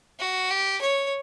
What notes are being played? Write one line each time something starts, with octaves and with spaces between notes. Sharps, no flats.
F#4
G4
C#5